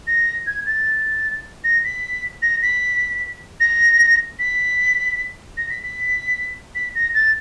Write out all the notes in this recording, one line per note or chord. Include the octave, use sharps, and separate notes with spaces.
A#6
G#6
A6
A#6
B6
A#6
B6
A#6
B6
A#6
B6
B6
B6
A#6
A6